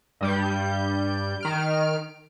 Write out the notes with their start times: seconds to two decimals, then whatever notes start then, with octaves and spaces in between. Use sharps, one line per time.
0.21 G2 G3 G6
1.41 D#3 F6 D7